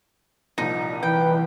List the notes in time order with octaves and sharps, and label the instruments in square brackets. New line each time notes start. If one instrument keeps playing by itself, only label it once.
[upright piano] C2 A#2 F3 [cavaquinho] D#4
[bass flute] E3 [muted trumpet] B4 [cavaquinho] G5